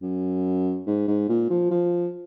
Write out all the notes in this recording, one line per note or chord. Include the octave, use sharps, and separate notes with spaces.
F#2
G#2
G#2
A#2
F3
F3